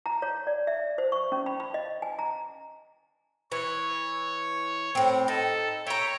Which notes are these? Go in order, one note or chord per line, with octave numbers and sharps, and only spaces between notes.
A#5
C#5
D5
E5
C5
C#6
C#4
B5
B5
D#5
G#5
A#5
E3 C#5
A2 C4
D#4 A4
C#5 E5 G5 A#5